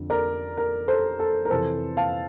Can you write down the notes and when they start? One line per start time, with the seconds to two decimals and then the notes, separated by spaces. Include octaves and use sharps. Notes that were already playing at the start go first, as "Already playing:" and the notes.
Already playing: F2 D3
0.10 A#4 D5
0.57 A#4
0.88 A4 C5
1.19 A4
1.45 A#4
1.50 F2 C3 E3 A4 C5
1.97 F5 A5